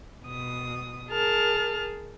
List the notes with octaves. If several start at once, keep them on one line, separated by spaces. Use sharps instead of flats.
B2 D#6
G#4 A#4 A5 F6